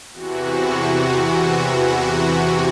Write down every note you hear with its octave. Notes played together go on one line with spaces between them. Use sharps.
E2 C3 E3 F#4